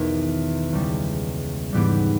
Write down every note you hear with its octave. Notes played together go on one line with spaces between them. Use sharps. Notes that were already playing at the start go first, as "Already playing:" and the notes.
Already playing: E1 B1 E2 D#3
C#2 C#3 G3
G#2 E3 G3 B3 G4